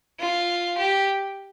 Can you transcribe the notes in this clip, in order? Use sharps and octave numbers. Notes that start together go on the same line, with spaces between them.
F4
G4